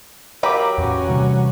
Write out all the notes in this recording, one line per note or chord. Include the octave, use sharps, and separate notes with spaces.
F#3 G4 A#4 B4 F5 A#5 D6
E2 A2 C#4 F#4
C3 E3 G3